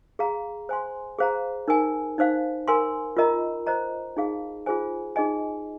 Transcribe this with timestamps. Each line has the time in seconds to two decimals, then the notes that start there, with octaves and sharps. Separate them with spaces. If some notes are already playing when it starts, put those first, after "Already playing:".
0.19 G#4 F5 A#5
0.69 C5 G#5 C6
1.19 G#4 C5 F5 A#5
1.68 D#4 A#4 G#5
2.18 D#4 C5 F5
2.68 A#4 G#5 C6
3.17 F4 A#4 D#5 A#5
3.67 C5 D#5 A#5
4.17 D#4 G#4 F5
4.66 F4 G#4 C5 G#5
5.16 D#4 G#4 D#5 G#5